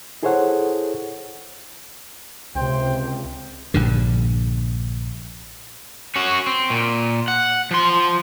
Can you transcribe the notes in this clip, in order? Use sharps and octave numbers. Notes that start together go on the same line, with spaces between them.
E4 G#4 A4 C5 C#5 F#5
C#2 C3 C5 G5
A#1 G2 D3
C#4 F#4
C4
A#2
F#5
F3 C6